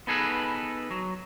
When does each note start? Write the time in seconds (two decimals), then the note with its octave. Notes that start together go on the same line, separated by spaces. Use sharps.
0.07 B3 D#4 G#4 A4 B4
0.91 F#3